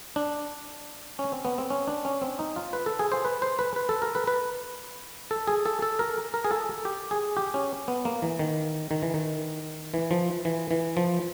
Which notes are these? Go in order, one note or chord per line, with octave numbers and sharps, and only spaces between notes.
D4
C#4
C4
B3
C4
C#4
D4
C#4
C4
D#4
F4
B4
A4
G#4
C5
B4
C5
B4
B4
A4
A#4
B4
B4
A4
G#4
A4
A4
A#4
A#4
G#4
A4
G4
G#4
G4
C#4
B3
A#3
E3
D#3
D#3
E3
D#3
E3
F3
E3
E3
F3